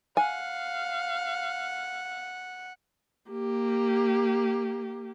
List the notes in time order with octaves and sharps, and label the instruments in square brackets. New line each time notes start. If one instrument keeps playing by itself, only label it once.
[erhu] F5 [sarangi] F#5 [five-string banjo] G#5
[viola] A#3 G4